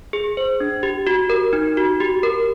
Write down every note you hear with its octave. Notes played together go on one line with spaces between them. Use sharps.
G#4
C5
D4
G4
F#4
A#4
D#4
F#4
G4
A#4